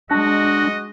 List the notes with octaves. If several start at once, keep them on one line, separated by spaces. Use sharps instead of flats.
G#3 D4 F#4 D#5